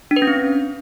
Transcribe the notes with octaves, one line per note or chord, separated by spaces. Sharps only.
D4
B4
C#4
C4